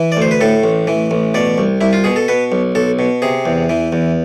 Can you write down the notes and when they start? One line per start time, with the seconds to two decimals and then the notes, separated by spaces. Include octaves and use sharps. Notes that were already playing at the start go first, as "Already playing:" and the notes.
Already playing: E3
0.12 D5
0.17 D2 C5
0.31 B4
0.41 A2 A4
0.64 A1
0.87 E3
1.11 A1
1.34 B2 D5
1.58 C2
1.81 C2 E4
1.93 F4
2.04 B2 G#4
2.16 A4
2.28 B2 B4
2.52 B1
2.75 B1 A4
2.99 B2
3.22 C3 G#4
3.45 E2
3.69 E3
3.92 E2